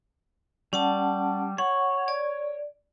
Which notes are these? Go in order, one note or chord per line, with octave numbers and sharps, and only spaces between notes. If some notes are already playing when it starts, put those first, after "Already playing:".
G3 C#4 F#5 A5
C#5 F#5
D5